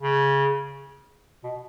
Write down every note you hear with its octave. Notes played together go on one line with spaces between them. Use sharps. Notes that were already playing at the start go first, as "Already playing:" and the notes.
C#3
B2